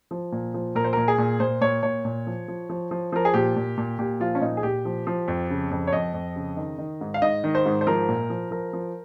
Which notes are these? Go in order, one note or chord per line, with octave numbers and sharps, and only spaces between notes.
F3
A#2
F3
A#2 A#4
C5
A#2 A#4
G#4
A#2
A#2 C5
A#2 C#5
A#2 C#5
A#2
F3
F3
F3
F3
F3 A#4
G#4
A#2 G4
A#2
A#2
A#2 G4
F3 F4
C#4
A#2 D#4
G#4
A#2 G4
F3
F3
F2
C#3
F2
C#5
F2 D#5
F2
C#3
D#3
D#3
G#2
F5
G#2 D#5
D#3
C5
G#2
C5
F3 A#4
A#2
F3
F3 A#4
F3